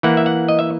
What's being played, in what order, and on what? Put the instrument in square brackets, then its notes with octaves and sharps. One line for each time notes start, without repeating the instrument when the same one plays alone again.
[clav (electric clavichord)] E3 A#3 E4 F#5
E5
F#5
D#5
E5